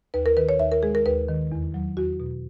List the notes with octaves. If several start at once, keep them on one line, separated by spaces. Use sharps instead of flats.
D#2 B4
A#4
D#3 B4
C#5
D#2 E5
A#4
G#3 G#4
A#4
D#2 B4
D#3
E2
F#3
E2 F#4
B2